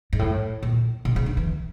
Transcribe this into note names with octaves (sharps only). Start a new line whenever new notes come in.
G#2
A2
A#2
B2
C#3
D3
E3